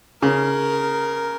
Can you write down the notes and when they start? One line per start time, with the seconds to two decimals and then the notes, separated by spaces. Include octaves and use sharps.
0.22 C#3 A#4